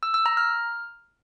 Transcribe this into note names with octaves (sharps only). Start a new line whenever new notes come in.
E6
E6
A#5
F6